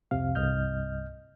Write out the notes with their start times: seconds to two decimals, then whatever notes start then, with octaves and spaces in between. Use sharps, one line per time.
0.11 C2 F2 C3 F5
0.35 C2 G2 D#5 F6 G6